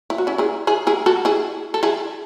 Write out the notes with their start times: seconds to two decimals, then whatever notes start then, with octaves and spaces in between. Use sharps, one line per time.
0.10 E4
0.18 F#4
0.27 C#4 E4
0.38 E4 G#4
0.67 E4 G#4
0.87 E4 G#4
1.06 F#4 A4
1.25 E4 G#4
1.74 A4
1.83 E4 G#4